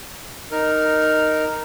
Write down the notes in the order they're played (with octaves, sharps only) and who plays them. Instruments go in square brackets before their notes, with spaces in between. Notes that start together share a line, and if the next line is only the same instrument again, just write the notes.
[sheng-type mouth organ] D#4 A#4